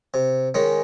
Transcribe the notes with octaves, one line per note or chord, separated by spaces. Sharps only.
C3
D#3 G#3 C#4